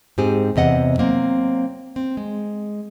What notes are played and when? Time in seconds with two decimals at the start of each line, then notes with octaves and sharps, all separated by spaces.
0.18 G#2 C4 G4 G#4
0.56 E2 C3 D#5 F#5
0.98 F#3 A#3 C4
1.96 C4
2.17 G#3